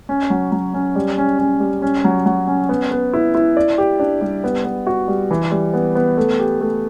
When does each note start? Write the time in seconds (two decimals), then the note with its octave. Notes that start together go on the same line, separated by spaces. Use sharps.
0.09 C#4
0.30 F#3
0.52 F#3
0.74 C#4
0.96 G3
1.18 C#4
1.39 C#4
1.60 G3
1.82 C#4
2.04 F#3
2.26 F#3
2.47 C#4
2.69 B3
2.91 B3
3.13 E4
3.35 E4
3.57 D5
3.78 G4
3.99 D4
4.21 G3
4.44 B3
4.65 B3
4.87 F#4
5.08 G3
5.31 E3
5.51 G3
5.74 B3
5.95 B3
6.17 A3
6.39 G4
6.61 A3